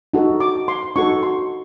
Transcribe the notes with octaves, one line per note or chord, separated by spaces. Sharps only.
D#4 F#4 A4
D6
C6
D#4 F#4 A4 C#6
C6